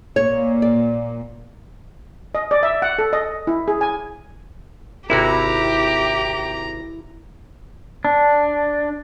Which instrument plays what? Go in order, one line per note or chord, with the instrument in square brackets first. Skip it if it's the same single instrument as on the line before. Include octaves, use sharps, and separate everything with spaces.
[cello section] A#2 [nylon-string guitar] C#5
[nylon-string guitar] D5
[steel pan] D#5
D5
E5
F#5
A4
D#5
E4
G#4
G#5
[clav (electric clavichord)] G#1 C3 F#4 [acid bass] E4 [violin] G4 [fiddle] A#5
[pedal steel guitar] D4